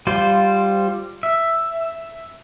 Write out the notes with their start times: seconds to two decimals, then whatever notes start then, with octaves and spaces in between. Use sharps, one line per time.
0.07 G3 F4 C5
1.23 E5